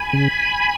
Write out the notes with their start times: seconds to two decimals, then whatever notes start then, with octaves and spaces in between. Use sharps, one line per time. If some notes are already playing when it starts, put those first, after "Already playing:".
Already playing: G#5 B5
0.13 C#3